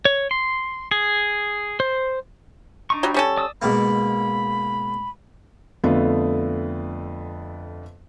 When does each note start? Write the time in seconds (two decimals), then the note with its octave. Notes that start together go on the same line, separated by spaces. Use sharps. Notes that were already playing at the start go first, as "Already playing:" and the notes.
0.05 C#5
0.31 C6
0.91 G#4
1.80 C5
2.90 D4 D#4 C#6
3.03 F#3 G3
3.14 G3 C#4 A4
3.37 D5 D#6 E6
3.62 G#2 B2 A#3 B5
5.84 F2 D3 A3 B3 F4